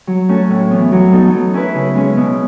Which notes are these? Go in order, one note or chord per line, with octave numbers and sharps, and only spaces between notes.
F#3
A3 C#4 F#4 A4
A2
E3 B3
F#3
B3 D#4 A4
F#3
C#4 E4 B4
C#3
G#3 C#4
B2